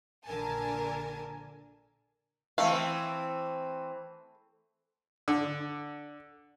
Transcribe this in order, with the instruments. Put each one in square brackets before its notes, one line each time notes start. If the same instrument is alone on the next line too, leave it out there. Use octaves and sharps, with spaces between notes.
[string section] A#1 D3 A#4 G#5 A5
[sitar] E3 C4 [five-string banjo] A3 F5
[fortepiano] D3